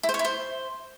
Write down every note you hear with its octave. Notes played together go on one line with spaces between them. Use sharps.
E4
C5
C#5
E4
C5